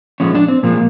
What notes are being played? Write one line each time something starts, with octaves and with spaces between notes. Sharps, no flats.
A#2 F3 G#3 C#4
D4
C4
A#2 F3 G#3 A#3